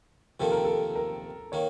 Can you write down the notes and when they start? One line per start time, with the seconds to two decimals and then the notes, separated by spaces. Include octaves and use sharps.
0.40 F2 C3 D#3 A#3 A4
0.52 A#4
0.65 A4
0.96 A#4
1.52 D#3 A#3 C#5